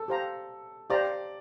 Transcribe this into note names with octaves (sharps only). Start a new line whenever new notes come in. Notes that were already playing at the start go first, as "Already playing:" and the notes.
Already playing: A4
G4 C5 F5 A#5
G4 C5 D5 F5 A#5